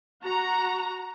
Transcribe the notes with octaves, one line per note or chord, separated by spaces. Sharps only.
F#4 A#5